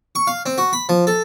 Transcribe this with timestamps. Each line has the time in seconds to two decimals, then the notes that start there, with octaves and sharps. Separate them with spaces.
0.15 C#6
0.27 F5
0.46 C4
0.58 F#4
0.73 B5
0.89 F3
1.07 A4